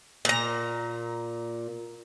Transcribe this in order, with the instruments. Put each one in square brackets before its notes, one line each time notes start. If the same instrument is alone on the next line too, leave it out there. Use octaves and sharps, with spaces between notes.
[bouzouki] A#2 A#5